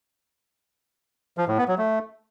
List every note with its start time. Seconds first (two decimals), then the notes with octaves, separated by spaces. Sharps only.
1.38 F3
1.48 A2
1.58 B3
1.68 F#3
1.78 A3